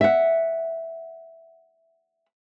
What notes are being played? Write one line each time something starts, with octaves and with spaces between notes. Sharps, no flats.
E5 F#5